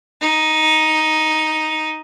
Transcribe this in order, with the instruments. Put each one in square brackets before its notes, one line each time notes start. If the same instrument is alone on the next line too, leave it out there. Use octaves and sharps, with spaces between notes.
[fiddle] D#4